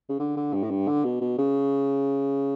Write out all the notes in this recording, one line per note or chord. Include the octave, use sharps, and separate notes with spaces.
C#3
D3
D3
G2
A2
G2
D3
B2
B2
C#3